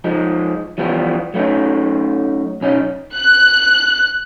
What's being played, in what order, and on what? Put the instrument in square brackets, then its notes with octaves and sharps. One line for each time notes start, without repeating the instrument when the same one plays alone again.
[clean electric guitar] F3 G#3 D#4
E3 F3 G3 B3 F4
F#3 A3 B3 C#4 D#4
B1 C#4 D#4
[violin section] F#6